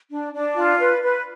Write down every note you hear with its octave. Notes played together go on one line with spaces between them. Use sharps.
D4
D4
F4
B4
B4